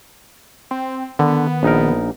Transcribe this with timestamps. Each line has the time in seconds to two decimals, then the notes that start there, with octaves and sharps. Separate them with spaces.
0.71 C4
1.19 D3 D#3 B3
1.63 A#1 D#4 A#4